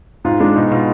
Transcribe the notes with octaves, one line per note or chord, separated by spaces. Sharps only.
G#2 F4
G#3 D4
B2 D#4
B2 F4